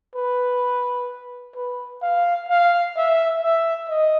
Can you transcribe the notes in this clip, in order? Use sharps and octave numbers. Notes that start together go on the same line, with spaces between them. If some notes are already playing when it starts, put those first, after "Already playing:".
B4
B4
F5
F5
E5
E5
D#5